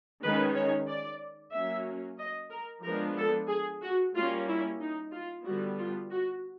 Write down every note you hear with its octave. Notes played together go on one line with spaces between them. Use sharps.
D#3 G#3 C#4 B4
C#5
D5
F#3 A#3 C#4 E5
D#5
A#4
F3 G#3 B3 D4 A#4
A4
G#4
F#4
G3 A#3 C#4 F4
E4
D#4
F4
D3 G3 B3 F#4
F4
F#4